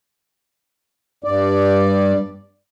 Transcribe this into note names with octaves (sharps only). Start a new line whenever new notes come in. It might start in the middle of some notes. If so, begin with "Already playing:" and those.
G2 D5